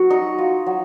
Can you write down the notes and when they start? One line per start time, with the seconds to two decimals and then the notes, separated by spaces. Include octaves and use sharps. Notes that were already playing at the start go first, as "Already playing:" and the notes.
Already playing: F#3 F#4
0.10 D#4
0.38 F4
0.66 F#3